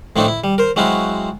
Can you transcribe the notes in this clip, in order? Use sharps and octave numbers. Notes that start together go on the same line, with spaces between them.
A2 F3 A3 C4 D4 D#4
E4
G3
A#4 C5
F#3 G#3 C4 E4 F#4 F5